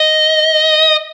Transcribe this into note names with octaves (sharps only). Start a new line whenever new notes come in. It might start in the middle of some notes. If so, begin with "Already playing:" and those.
Already playing: D#5